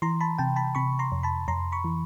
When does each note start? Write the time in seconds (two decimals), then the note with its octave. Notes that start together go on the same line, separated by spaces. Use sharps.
0.02 E3 A#5 C6
0.20 A5 B5
0.38 C3 G5 A5
0.56 A5 B5
0.75 C3 B5 C#6
0.99 A#5 C6
1.12 F2
1.23 A5 B5
1.48 F2 A#5 C6
1.72 B5 C#6
1.84 E3